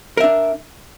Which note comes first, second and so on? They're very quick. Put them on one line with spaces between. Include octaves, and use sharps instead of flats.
A#4 E5 D4